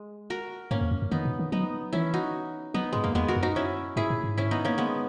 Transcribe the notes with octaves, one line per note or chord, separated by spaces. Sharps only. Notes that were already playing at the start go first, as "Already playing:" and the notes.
Already playing: G#3
F#4 A#4
G#2 A#3 C#4
E2
F#2
F#2
D#3 B3 D#4
B2
D#3
F#3 B3 D#4
E3 C#4 E4
D#4 F#4
F#3 B3 D#4
G#2 G#3
F#2 A#3
E2 G#3 B3
F#4 A#4
F#2
D#4 F#4
C#4 E4
G#2 E4 G#4
A#2
G#2
C#4 E4
B3 D#4
A#3 C#4
G#3 B3